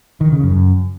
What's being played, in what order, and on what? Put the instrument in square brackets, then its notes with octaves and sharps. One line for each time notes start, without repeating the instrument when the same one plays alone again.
[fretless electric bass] D#3
C#3
F#2